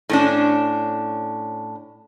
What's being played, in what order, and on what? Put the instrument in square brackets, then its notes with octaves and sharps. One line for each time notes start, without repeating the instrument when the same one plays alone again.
[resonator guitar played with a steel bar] A2 C#4 D4